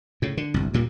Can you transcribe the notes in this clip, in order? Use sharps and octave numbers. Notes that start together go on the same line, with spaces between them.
A2 C#3
D3
G1 C2
D2 A#2 G3 A#3